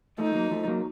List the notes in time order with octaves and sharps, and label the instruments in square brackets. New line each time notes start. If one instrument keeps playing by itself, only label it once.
[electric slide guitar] F3 A3 [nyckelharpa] D#4
[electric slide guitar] F#3 A#3
F3 A3
F#3 A#3